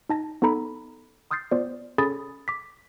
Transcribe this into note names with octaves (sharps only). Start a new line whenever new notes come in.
D#4 A5 A#6
B3 D#4 A4 A#5 B5
C6 D#6 F6 G6 A6 C7
B3 F4 C5 D5
C#4 G#4 A4 B5 D#6 A6
D6 B6